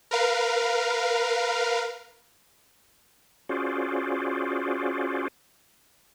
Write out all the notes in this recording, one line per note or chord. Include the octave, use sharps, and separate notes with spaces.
A#4 B4 F5
C#4 F4 F#4 G#4 C5 D5